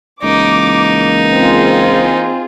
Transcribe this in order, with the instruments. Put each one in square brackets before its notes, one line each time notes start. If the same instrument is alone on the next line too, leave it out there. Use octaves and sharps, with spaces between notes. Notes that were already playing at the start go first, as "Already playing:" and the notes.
[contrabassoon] C#2 [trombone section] E3 A#3 [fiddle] D#4 [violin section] D6
[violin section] C4 F4 G#4